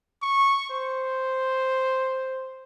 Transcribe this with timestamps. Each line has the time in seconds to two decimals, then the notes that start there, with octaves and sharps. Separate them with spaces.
0.23 C#6
0.70 C5